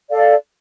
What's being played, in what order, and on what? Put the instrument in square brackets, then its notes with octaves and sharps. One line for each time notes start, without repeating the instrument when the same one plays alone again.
[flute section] A4 D5 F5